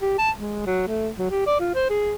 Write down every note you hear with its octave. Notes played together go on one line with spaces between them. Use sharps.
G4
A5
G#3
F#3
A3
F#3
G4
D5
F4
C5
G#4